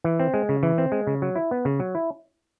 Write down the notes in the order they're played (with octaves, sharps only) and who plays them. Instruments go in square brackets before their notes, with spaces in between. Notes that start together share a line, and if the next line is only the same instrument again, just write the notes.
[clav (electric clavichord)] E3
C4
G#3
C#3
E3
C4
G#3
C#3
F#3
E4
B3
C#3
F#3
E4